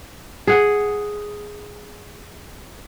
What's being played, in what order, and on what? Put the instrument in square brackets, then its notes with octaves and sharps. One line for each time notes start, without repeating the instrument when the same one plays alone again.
[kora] G#4 F#5